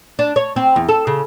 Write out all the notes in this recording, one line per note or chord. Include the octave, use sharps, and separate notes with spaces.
D4
C#5
C4
E2
A4
C#3